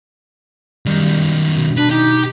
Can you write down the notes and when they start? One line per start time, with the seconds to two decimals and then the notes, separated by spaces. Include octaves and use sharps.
0.86 F#2 D#3 G3
1.57 B2
1.77 D4 B4
1.91 D#4 G4